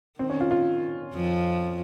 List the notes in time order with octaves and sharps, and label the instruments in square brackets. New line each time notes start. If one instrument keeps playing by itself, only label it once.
[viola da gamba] D#3 [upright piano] C4
[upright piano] C#4
F4
F4
[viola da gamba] F2 F3